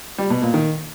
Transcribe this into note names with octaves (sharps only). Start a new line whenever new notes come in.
G3
B2
A#2
D#3